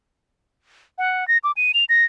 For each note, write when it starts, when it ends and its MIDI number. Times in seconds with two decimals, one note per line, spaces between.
0.98 1.27 78
1.28 1.38 94
1.44 1.52 86
1.57 1.72 99
1.74 1.84 101
1.89 2.05 94